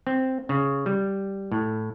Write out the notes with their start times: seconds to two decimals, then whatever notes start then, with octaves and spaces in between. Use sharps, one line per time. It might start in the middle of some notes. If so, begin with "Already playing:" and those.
0.07 C4
0.49 C#3
0.86 G3
1.52 A2